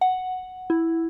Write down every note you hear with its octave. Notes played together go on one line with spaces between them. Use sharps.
F#5
E4